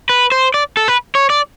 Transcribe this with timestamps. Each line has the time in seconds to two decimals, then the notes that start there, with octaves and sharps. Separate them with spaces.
0.09 B4
0.32 C5
0.54 D5
0.77 A4
0.88 B4
1.15 C#5
1.30 D5